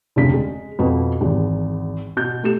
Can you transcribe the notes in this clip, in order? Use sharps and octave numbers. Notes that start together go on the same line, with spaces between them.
F1 D2 C#3 B6
G#3
F2 B2 B4
G#1 E2
B2 G6
A3 G4 E7